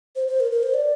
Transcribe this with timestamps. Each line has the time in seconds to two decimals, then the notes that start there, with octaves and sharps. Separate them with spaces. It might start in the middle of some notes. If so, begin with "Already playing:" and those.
0.16 C5
0.28 C5
0.40 A#4
0.51 A#4
0.63 C5
0.74 D5